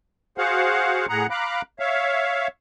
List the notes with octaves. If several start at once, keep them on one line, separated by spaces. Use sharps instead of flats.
F#4 G#4 C5 F5 F#5
A2 G#4 F#5 A#5
F5 A#5 B5 D6 F#6
C#5 E5 F5